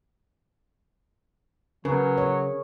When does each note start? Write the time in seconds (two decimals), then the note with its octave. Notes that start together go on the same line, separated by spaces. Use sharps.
1.85 C#3 F#3 C#4 A#4 B4 C#6
2.18 G#4 C#5